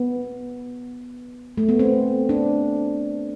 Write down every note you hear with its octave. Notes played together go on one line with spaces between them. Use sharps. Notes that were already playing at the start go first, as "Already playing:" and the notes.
Already playing: B3
A3
B3
C4
D4